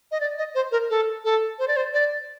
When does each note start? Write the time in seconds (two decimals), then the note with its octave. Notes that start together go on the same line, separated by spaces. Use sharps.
0.12 D#5
0.21 D5
0.38 D#5
0.55 C5
0.72 A#4
0.90 A4
1.25 A4
1.59 C5
1.68 D5
1.77 C5
1.93 D5